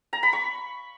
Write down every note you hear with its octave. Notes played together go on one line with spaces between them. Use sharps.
A#5
B5
C#6